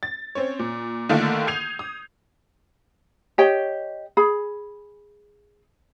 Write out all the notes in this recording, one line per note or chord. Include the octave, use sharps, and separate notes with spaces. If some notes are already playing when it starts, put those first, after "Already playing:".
A6
C4 C#4 C#5
A#2
D3 D#3 A3 A#3 F4 A4
D#6 G6 G#6 C7 D#7 F7
D#6
G4 C#5 D#5 G5
G#4 B5